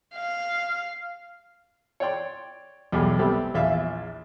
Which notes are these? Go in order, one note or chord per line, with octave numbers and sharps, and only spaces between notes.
F5
C#5 D5 G5 C6
B1 E2 G3
C3 G3 B3 C4 A4
A#1 E2 E5 F5 E6